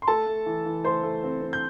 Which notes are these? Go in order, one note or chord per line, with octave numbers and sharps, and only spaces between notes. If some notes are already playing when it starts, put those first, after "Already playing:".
C6
A3 A4 A5
A3
E3
E3
A3 C5 C6
A3
C4
C4
G6